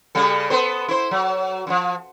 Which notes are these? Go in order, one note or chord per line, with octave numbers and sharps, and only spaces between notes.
C#3 G3 A4
B3 A4 C5
E4 C5
F#3
F#2 F3